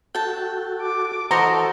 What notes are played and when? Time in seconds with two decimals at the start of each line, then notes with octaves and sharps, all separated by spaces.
0.15 F#4 A4 G5 A5
0.82 D6
1.31 E3 F#4 A4 C5 D#5 A#5